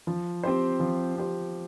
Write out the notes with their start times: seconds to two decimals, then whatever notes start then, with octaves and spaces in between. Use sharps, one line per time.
0.07 F3
0.43 C4 G4 C5
0.80 F3
1.16 C4 G4 C5